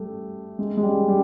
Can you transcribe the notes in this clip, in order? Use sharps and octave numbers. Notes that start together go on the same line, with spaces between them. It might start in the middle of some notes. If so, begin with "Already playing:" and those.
Already playing: G3 A3
G#3
G#3
G3
G3